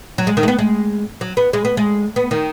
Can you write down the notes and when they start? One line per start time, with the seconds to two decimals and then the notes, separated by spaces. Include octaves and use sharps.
0.18 F#3
0.27 G#3
0.37 D#3
0.43 G#3
0.48 B3
0.59 G#3
1.21 F#3
1.37 B3
1.53 G#3
1.65 B3
1.77 G#3
2.16 B3
2.31 D#3